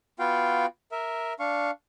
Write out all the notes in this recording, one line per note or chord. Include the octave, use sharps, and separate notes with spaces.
B3 F4 F#4 F5 G5
A#4 E5
D4 F5 C#6